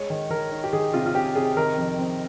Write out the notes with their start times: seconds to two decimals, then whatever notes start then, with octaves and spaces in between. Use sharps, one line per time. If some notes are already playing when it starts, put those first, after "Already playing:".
Already playing: G#3 C#5
0.10 D#3
0.30 D#3 A#4
0.52 D#4
0.64 G4
0.73 D#3 G#4
0.94 C3 F4
1.06 F4
1.15 C3 G4
1.35 C3 G#4
1.57 D#3 A#4
1.78 F2
1.98 C4